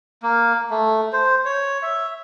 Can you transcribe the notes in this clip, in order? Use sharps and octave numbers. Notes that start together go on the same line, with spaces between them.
A#3
A3
C5
C#5
E5